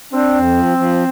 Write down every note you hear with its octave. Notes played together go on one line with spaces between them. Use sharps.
C4 D4
F2
F3
F3